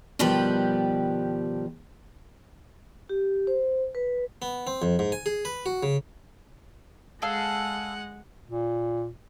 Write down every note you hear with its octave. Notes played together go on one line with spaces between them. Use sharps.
B2 D#3 F3 G3 G4 B4
G4
C5
B4
B3
C4
F2
G#2
G#5
G#4
B4
F#4
C#3
G#3 G#4 A4 F5 F#5
A#2